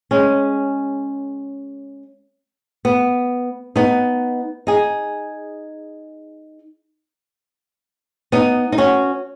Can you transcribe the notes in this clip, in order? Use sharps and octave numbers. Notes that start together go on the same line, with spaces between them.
G#3 C#4
B3
B3 D#4
D#4 G#4
B3 D#4
D#4
C#4 F#4